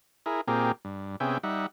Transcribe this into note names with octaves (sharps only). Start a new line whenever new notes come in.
E4 G#4 A#4
A#2 C4 G4 G#4 A#4
G2
C3 B3 C#4 G#4 E5 G5
G3 D#4 E5 F#5